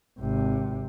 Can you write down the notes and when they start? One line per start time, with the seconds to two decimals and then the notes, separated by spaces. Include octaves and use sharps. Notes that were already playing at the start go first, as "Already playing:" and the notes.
0.20 G#1 C3